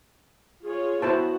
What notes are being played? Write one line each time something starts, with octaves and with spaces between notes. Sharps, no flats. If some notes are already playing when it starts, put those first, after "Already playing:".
F4 G#4 C#5
B3 E4 F#4 C5 A5